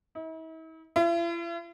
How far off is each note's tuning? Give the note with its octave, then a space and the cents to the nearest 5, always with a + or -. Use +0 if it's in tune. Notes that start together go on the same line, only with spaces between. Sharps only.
E4 -45
E4 +45